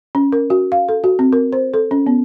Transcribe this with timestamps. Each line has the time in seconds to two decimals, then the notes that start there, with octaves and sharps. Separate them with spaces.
0.15 C#4
0.32 A#4
0.50 F#4
0.72 F5
0.89 A4
1.04 F#4
1.19 C4
1.33 A#4
1.53 C5
1.74 A4
1.91 C#4
2.07 B3